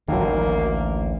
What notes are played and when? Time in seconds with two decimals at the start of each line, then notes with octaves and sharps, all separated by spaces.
0.08 A1 D2 D#3 F#3 A#3